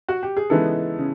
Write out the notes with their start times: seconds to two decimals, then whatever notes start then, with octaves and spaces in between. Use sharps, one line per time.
0.09 F#4
0.23 G4
0.37 G#4
0.49 C#3 E3 G#3 B3 D#4 A4
0.99 C#3